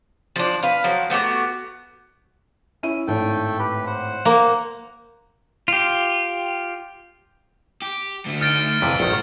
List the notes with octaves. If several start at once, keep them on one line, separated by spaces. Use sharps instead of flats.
F3 D4
B4 F5
F3 F#3
A3 B3 F#4 G4
C#4 E4 D#7
G#1 A2 A3 A4 G5
G4 B4
C5 F#5
A#3
F4 G4
G4
D2 A3
D#4 F6 A6 D7
C2 F2 C3 E3 B4
A#1 A2 D#3 G#3 F#5